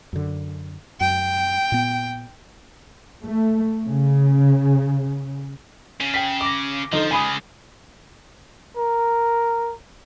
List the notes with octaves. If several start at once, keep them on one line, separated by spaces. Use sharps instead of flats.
F#2 D3
F#2 G5
A#2 B3
A3
C#3
C#3
G5 B6
D6 A#6
D3 F3 D#4
C#3 G#3 G#5 B5 D#6
A#4